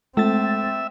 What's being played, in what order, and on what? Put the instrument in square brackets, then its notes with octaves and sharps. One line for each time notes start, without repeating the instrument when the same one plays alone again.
[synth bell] G#3 [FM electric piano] A3 A6 [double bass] C4 [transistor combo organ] E5